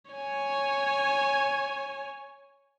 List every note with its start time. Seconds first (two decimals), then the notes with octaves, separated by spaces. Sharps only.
0.11 C#5 G#5